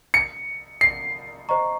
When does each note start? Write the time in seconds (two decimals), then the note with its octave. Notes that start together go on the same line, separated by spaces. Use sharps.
0.14 C#7
0.81 C7
1.49 C5 D#5 A#5 C#6